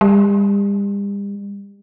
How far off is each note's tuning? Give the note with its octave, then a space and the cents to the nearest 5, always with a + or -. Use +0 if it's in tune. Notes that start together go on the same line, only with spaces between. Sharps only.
G3 +40